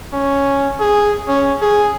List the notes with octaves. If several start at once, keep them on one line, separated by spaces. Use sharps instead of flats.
C#4
G#4
C#4
G#4